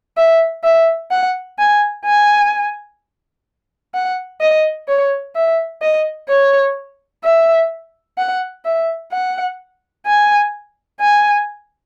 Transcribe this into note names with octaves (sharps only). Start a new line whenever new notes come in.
E5
E5
F#5
G#5
G#5
F#5
D#5
C#5
E5
D#5
C#5
E5
F#5
E5
F#5
G#5
G#5